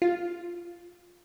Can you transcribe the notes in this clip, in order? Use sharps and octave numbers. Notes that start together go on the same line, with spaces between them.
F4